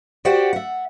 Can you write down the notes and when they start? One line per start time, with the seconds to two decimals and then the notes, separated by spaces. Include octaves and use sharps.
0.25 F#4 G4 C5 D5 F#5 G5
0.53 E5 F#5